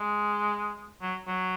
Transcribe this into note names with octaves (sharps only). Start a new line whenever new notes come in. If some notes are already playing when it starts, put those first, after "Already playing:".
Already playing: G#3
F#3
F#3